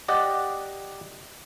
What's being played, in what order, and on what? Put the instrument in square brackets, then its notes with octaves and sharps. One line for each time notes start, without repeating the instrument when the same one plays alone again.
[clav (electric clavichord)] G4 D5 D#5 F#5